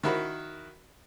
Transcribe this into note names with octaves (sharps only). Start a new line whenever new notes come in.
D#3 E4 F#4 B5